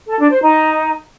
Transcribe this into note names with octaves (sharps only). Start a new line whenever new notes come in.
A4
D4
C5
D#4